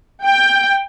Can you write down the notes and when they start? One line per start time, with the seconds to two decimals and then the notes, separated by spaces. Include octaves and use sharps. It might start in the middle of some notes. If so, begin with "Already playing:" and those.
0.25 G5